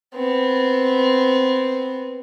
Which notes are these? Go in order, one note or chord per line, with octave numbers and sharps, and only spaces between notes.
B3 C4